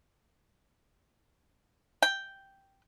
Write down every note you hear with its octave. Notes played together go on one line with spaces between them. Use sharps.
G5